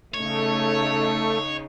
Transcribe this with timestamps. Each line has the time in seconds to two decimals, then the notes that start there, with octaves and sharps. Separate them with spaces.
0.14 C#3 A3 D#4 C#5